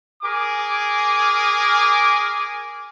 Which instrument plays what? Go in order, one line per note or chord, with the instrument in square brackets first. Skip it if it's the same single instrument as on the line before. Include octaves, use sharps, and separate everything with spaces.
[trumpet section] G#4 A#4 D6